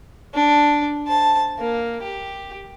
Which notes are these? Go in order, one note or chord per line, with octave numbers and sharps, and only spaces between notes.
D4
C5 A5
A#3
G4